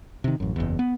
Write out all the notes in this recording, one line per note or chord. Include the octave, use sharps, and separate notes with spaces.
C3 D#3
A1 F#2
F#1 E2
B3